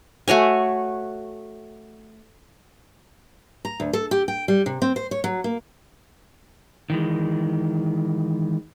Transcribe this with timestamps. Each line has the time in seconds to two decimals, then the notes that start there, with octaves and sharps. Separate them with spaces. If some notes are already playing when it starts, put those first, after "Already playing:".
0.28 A3 F#4 C#5 G#5
3.65 A#5
3.80 D2
3.93 A4
4.11 G4
4.28 G5
4.48 G3
4.66 C3
4.82 C4
4.96 C5
5.11 C#5
5.24 F#3
5.44 A#3
6.90 D#3 E3 G#3